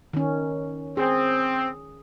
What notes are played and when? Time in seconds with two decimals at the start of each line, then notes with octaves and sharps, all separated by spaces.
0.13 D#3 C#4
0.97 C4 G#4